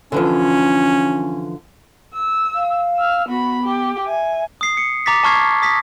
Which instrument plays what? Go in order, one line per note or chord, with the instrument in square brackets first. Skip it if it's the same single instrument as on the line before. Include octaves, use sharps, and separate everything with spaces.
[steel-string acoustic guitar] D3 E3 F3 [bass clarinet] C#4
[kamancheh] E6
[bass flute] F5
[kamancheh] E6 F6
[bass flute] B3 [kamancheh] F#4 B5
[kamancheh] G4
[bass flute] E5 [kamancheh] G#5
[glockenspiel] D#6 C7
C#7
A#5 D6 A6 B6
A5 A#5 C#6 F6 G#6 C7
D#6 A#6 B6